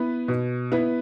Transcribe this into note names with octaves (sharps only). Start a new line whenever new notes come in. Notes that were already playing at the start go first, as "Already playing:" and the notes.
Already playing: B3 E4 B4
B2
B3 E4 B4